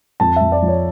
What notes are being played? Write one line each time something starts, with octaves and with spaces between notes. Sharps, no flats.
F2 A5
E5
F2
D5
F3
C#5